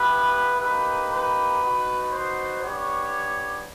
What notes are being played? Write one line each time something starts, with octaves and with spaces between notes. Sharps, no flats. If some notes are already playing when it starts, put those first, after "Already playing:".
Already playing: B3 E4 G4 B4
A#3 D#4 G4 B4
B4
B3 D#4 F#4
C5
B3 D4 G4 C#5